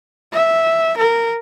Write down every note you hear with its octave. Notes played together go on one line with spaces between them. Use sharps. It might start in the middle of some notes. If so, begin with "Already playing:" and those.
E5
A#4